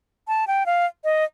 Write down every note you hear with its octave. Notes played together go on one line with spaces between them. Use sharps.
A5
G5
F5
D#5